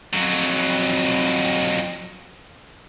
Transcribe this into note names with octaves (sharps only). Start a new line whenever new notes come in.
F2 F#3